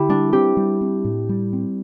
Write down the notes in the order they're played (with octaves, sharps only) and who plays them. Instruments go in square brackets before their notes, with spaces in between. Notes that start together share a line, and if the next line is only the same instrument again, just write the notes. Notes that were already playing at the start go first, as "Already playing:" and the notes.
Already playing: [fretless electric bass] D3 [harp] E4 G4
[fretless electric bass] G3 [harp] D4
[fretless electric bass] C4 [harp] G4
[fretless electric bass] G3
C4
A2
G3
C4